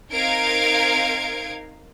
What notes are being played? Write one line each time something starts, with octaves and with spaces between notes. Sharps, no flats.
C4 D#4 A#4 F5 G#6 D7